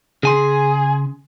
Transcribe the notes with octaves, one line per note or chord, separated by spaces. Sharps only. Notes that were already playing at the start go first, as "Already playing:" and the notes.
C#3 G#4 G#5 C6